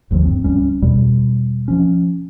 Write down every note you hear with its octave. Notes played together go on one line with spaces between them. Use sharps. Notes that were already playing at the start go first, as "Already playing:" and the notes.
G1 D#2 D3 F3
G2 C4
C#2 G3 C#4
E2 B2 G3
F3 C#4